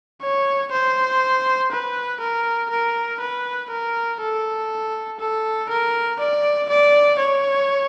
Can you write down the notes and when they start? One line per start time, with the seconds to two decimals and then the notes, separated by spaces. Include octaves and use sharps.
0.22 C#5
0.71 C5
1.71 B4
2.21 A#4
2.70 A#4
3.20 B4
3.71 A#4
4.20 A4
5.20 A4
5.69 A#4
6.19 D5
6.69 D5
7.19 C#5